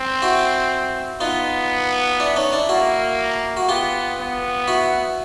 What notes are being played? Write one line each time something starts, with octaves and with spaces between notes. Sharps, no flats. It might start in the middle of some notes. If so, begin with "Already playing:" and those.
Already playing: C4
E4 F#4
B3 D#4 F4
D4 E4
C#4 D#4
D4 E4
A#3 E4 F#4
F#4
B3 F4 G4
B3
E4 F#4